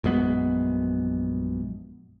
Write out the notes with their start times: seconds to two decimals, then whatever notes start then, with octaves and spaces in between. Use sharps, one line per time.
0.04 A#1 F#2 G#3 B3